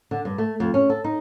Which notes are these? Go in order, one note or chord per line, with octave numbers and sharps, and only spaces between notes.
D3
G2
A3
F2
C#4
A4
D#4